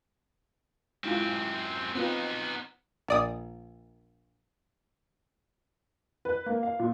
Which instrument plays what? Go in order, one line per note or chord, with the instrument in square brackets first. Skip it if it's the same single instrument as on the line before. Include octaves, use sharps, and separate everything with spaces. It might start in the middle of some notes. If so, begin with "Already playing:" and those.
[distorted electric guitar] F#2 C4 [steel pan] G#3 E4 F4
[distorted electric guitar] B3 D#4 [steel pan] C4 F4 B4
[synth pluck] A#1 D5 D#6
[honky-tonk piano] B4
A#3
F5
A#2